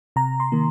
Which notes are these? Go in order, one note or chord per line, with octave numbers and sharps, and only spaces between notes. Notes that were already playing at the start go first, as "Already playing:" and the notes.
C3 A#5
C6
D#3 A#3